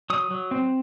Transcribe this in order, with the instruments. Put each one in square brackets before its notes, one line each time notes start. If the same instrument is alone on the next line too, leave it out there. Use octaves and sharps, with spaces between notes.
[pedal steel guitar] F#3 D#6
F#3
C4